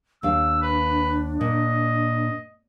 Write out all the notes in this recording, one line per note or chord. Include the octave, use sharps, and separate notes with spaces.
D#2 D4 F5 E6
B4
A#2 D#5